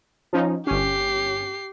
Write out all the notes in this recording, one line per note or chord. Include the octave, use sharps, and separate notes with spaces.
F3 C#4 D#4
G1 C#4 G4 C7